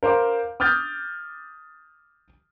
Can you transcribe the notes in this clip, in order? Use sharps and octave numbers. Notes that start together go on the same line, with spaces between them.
A#4 C5 F5 D6
D6 D#6 F6 G6 A6